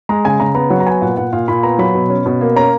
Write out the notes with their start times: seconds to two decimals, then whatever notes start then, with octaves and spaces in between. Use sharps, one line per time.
0.09 G#3 A#5
0.25 C#3 G#5
0.40 C#3 A#5
0.55 B3 A#5
0.70 F#3 F#5
0.80 A#5
0.86 B3 G#5
1.01 A#2 F#5
1.17 A#2 F#5
1.33 A#2 F5
1.48 A#2 B5
1.63 B3 A#5
1.79 F#3 B5
1.94 B2
2.10 C#4
2.26 B2
2.41 A#3
2.56 C#4 A#5